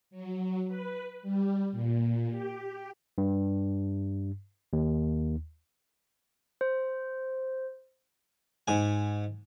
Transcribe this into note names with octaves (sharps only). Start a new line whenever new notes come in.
F#3
B4
G3
A#2
G4
G2
D#2
C5
G#2 G#5